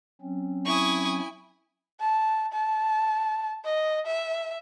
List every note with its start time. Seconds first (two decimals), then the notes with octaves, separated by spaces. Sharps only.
0.21 F#3 C4 C#4
0.65 E4 G#5 C#6 D#6
2.00 A5
2.53 A5
3.65 D#5
4.06 E5